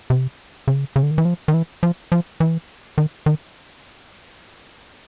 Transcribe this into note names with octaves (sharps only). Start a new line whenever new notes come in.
C3
C#3
C#3
D3
D#3
E3
F3
D#3
E3
F3
F3
E3
D#3
D#3